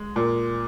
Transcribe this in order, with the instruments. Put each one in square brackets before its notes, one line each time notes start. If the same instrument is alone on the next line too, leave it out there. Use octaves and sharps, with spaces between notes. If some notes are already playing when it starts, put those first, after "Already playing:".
Already playing: [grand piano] G#3
[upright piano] A#2